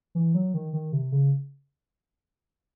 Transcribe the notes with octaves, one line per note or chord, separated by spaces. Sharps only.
E3
F#3
D#3
D#3
C3
C#3